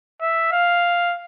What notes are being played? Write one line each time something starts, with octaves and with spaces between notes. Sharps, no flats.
E5
F5